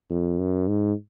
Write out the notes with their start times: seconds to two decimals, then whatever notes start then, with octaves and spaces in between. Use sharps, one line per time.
0.10 F2
0.39 F#2
0.68 G#2